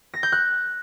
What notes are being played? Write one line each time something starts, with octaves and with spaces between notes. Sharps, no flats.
A#6
G6
F#6